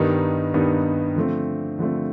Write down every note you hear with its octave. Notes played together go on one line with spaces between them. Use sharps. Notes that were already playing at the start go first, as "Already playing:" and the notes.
Already playing: G2 D#3 G3 B3 D#4
G2 D#3 G3 B3 D#4
D3 F3 A3 C4
D3 F3 A3 C4